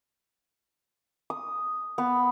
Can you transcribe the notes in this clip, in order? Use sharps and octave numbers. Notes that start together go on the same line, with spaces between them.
D#6
B3